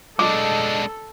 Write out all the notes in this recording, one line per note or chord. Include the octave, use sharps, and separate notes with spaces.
G#3 D4 A4 D#5 D6